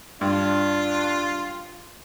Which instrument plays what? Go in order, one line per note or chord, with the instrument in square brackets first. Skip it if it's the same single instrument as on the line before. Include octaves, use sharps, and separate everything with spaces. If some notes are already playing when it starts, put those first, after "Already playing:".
[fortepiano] G2 [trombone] D4 [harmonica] F4